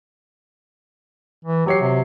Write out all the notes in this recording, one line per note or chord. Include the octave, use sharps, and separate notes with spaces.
E3
F#3 G4 C#5 C7
C3